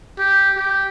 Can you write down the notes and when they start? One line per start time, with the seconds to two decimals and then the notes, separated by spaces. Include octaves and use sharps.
0.19 G4
0.57 G4